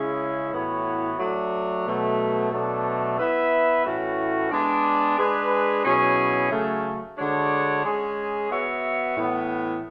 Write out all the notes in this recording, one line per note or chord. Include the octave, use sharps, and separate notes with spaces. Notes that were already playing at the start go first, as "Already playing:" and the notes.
Already playing: C#3 G#3 C#4 E4 G#4
A2 E3 B3 F#4 C#5
F#3 A3 D4
B2 F#3 A3
B2 F#3 A3 D4 A4
B3 E4 B4 E5
A2 E3 A3 C#4 F#4
G#3 B3 D4
G#3 D4 G#4 B4
B2 F#3 C#4 E4 G#4
C#3 F#3 A3
D3 G#3 D4 F#4 C#5
G#3 C#4 G#4
B3 F#4 C#5 E5
A2 E3 B3